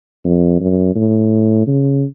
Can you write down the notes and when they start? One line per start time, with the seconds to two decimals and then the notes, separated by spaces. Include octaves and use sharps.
0.25 F2
0.61 F#2
0.96 A2
1.67 C#3